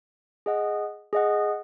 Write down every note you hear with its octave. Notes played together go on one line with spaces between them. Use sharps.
G#4 D#5 F#5
G#4 D#5 F#5